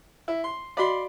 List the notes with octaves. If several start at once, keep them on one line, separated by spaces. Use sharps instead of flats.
E4
C6
F#4 D5 D#5 F5 B5 C6